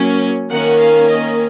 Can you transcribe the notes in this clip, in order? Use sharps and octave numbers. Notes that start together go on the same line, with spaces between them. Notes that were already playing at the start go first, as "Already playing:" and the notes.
Already playing: F#3 A#3 C#4
D#3 A#3 C#4 F#5
F5
D#5